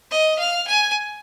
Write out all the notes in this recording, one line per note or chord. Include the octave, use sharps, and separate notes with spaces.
D#5
F5
G#5